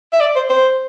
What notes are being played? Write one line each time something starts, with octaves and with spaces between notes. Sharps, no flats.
E5
D5
C5
C5